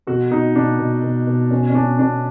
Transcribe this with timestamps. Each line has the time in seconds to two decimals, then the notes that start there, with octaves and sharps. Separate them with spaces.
0.07 B2 F#4
0.31 B2 D#4
0.56 B2 D4
0.79 B2
1.03 B2
1.27 B2
1.51 B2 C#4
1.70 C#4
1.75 B2 D4
1.98 B2 D4